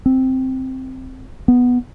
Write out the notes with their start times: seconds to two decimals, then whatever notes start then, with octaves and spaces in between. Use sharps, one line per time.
0.06 C4
1.48 B3